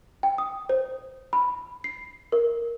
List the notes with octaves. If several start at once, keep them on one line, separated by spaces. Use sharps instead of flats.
G5
D#6
C5
B5
C7
A#4